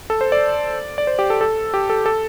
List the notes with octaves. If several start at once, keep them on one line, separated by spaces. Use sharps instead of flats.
A4
C5
D5
D5
C5
G4
A4
A4
G4
A4
A4